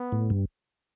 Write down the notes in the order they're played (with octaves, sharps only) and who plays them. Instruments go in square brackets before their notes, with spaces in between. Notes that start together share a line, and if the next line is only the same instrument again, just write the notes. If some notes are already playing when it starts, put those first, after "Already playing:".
Already playing: [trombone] B3
[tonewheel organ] A2
G2